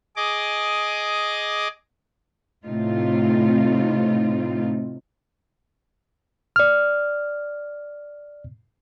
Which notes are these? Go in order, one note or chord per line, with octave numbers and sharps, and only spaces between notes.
G#4 D#5 D6
A2 C3 C4 D#4 F4
D5 F6